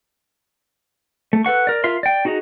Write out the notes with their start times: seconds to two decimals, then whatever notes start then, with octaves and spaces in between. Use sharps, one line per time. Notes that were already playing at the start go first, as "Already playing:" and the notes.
1.33 A3
1.45 A4 B4 F#5 C#6
1.67 A#4 D5
1.84 F4 A#4 E5 C6
2.03 D5 G5
2.25 D#4 F#4 G#4 D#5 A#5